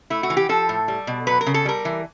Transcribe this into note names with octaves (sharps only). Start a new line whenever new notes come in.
A3 E4
F#4
E3
G4
F3 A4
A2
G3
B2
F#3 B4
A#4
C#3
A4
G3 A#4
E3